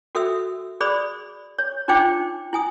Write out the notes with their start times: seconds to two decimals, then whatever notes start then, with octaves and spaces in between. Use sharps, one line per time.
0.15 F#4 A4 E5 D#6 E6
0.81 G#4 C5 D5 B5 D#6
1.58 C#5
1.88 D4 D#4 F4 C5 G5 D6
2.53 E4 G#5 D#6